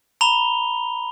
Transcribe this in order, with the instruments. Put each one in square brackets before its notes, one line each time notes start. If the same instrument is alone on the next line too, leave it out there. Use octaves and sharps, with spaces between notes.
[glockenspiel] A#5 B5 F7 G7